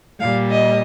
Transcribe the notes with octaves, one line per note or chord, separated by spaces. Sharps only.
A#2 G3 F5
D#5